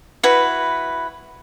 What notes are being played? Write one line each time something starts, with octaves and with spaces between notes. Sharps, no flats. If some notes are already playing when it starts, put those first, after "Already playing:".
E4 F#4 B4